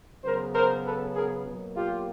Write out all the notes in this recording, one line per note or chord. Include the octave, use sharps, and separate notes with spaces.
C#3 F#3 B3 A#4 C5
A#4 C5
A4 B4
G#4 A#4
B2 F#3 A#3
F4 G4